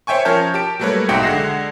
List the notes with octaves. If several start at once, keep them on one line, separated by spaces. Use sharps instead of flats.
C5 C#5 E5 G5 G#5 C#6
F3 C#4 A#4 C#5 A5 G6
G4 A5 D7
F#3 G3 A3 A#3 B4 C#5
B1 G#2 F#4 E5 G5 C#7
D3 G#3 F#5 A#6 C7 E7